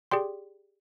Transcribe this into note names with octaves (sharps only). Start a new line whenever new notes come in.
G4 G#4 D5 G5 C6